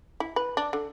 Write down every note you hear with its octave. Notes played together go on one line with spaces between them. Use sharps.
E4
B4
D4
D3